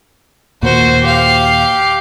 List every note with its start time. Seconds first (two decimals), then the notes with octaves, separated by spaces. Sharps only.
0.62 D#2 A#2 A#3 F#4 C5
1.02 G4 F5